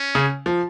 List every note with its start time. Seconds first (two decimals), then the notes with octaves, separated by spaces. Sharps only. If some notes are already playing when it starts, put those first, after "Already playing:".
Already playing: C#4
0.15 C#3
0.46 F3